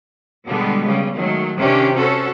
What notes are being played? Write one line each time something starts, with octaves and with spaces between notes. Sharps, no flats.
B2 D3 G3 G#3 B3
C#3 G3
D#3 F#3 G#3 A3
C3 D#3 C#4 D4 G4
C#4 F#4 A4 C5